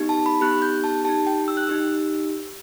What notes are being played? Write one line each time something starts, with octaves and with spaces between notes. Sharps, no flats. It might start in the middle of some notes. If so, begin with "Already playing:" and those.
Already playing: B3 D#4 G4
A5
B5
B3 D#4 G4 F#6
G6
A5
D#4 G4 A5
G5
E6
F#6
D#4 G4 E6